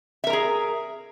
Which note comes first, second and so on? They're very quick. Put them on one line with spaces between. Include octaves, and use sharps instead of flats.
E5 A#4 A#5 G#4